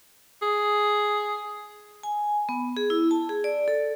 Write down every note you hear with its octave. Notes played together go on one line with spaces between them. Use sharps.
G#4
G#5
B3
G#4
E4
A5
G#4
D5
A4